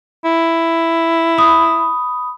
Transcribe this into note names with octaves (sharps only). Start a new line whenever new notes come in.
E4
B5 D#6